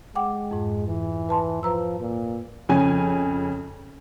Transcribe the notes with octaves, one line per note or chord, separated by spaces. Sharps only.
G#3 F#5 G5 D6
F2 G#2
E3
B4 A5 C6
F3 B4 A#5 E6
A#2
F2 C#3 C#4 G#5